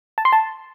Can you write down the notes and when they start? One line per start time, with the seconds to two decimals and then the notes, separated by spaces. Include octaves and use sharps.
0.18 A5
0.25 C6
0.33 A5